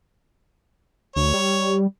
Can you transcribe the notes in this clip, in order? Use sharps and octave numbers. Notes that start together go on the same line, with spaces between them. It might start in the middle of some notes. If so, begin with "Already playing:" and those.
D2 C#5
G3